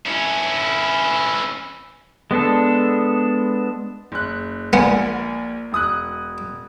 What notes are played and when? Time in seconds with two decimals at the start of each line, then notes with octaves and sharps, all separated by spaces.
0.06 C#4 E4
2.31 G#3 B3 D4 A4
4.12 F#1 F#6
4.73 A#1 A#3 B3 F#5 G#5
5.72 E1 D#6 F#6